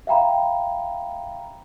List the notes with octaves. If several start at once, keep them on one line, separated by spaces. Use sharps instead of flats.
E5 F5 G5 A#5 B5